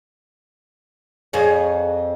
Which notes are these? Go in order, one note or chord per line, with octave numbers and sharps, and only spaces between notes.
F2 G#4 C#5